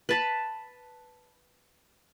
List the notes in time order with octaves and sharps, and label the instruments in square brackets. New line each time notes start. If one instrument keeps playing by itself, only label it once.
[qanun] B4 A5 B5